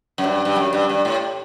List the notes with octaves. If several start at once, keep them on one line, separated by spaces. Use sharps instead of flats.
F#2
G2
G2
F#2
G2
G2
A2